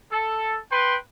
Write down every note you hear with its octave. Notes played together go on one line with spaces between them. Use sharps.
A4
B4 G5 C6